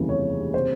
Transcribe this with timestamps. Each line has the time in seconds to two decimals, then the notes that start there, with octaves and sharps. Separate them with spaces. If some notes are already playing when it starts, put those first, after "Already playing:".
Already playing: F1 D#2 C#3 E3 G3
0.09 C#5
0.54 C3 C5